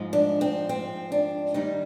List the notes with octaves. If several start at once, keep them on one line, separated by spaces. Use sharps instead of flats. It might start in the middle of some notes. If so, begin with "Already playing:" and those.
Already playing: G#2 F3 G#3
D4
C4
C4
D4
G2 D#3 G3 A#3 D#4